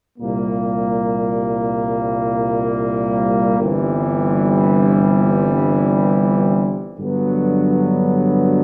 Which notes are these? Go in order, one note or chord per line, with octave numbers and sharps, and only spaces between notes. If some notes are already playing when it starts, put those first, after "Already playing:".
C2 A#2 G3 A#3
G1 G2 E3 G3 C4
G2 D3 F#3 B3